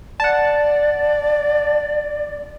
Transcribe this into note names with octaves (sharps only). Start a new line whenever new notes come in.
D5 F#5 A5